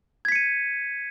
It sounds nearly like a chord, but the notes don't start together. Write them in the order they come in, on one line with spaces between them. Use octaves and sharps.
G#6 B6 C#7 D#7